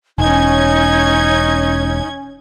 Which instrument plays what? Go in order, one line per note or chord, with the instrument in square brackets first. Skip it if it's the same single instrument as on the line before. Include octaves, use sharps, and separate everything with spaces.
[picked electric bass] E1 [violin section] C#4 G#6 [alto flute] D#4 [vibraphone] G#5